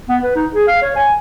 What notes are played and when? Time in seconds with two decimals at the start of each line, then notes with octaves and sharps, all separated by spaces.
0.09 B3
0.23 B4
0.35 D#4
0.54 G#4
0.68 F5
0.83 C#5
0.96 G#5